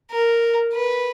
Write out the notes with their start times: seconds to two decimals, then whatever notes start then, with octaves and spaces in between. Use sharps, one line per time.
0.11 A#4
0.74 B4